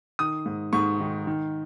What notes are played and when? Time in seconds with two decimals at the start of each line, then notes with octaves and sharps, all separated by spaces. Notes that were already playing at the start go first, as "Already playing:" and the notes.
0.19 D#3 D#6
0.46 G#2
0.73 G#2 C#6
1.00 D#3
1.27 D#3